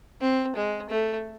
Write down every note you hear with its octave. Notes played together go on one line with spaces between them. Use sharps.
C4
G#3
A3